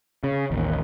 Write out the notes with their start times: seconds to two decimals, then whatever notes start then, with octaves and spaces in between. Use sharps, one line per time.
0.24 C#3
0.51 A1 D#2